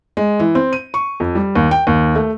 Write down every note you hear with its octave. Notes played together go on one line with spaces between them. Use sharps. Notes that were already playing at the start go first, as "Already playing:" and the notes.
G#3
E3
C4
D#7
C#6
F2
G3
D#2
G5
D#2
A3